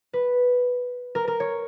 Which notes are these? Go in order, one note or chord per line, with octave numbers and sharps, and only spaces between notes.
B4
A#4
A#4
C#5